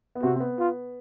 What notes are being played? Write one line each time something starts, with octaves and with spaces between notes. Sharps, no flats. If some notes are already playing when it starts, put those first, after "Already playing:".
B3
C3 C4 F#4
C4
B3
F4